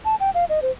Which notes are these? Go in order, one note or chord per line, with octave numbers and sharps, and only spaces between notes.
A5
G5
F5
D#5
C5